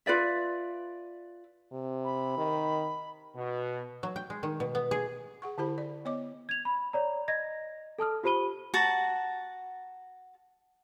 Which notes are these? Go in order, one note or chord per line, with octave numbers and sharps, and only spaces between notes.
F4 B4 D5 E5
C3
B5
D#3
B2
F#3
G5
G#3
D#3
B2
B3
G#4
G#4 F#5 C#6
D3 E4 G4 C5 B5
D5
B3 C#5 D#5 D6
G#6 F7
B5
C#5 D5 A#5
D#5 G#6 A#6
A4 A5 D#6 F6
F4 G4 C5 B5 D#7 G7
F#4 F#5 A5 A#5